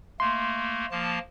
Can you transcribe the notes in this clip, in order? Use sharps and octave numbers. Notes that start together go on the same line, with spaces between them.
A3 A#3 C6
F3 A#3 A5